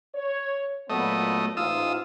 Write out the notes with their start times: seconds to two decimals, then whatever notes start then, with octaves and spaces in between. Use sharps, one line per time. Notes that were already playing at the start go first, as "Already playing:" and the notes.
0.15 C#5
0.90 A#2 F#3 A3 B3 D#5
1.57 A1 G#2 F4 D#6 E6